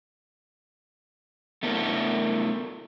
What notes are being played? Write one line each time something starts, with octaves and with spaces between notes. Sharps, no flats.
A3 B3 D4 E4 A#4